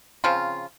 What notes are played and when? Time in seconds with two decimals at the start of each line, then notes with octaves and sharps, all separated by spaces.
0.24 C#3 F3 C4 F4